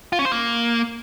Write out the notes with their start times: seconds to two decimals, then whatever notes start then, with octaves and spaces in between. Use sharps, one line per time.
0.13 F4
0.19 C#4
0.25 C5
0.32 A#3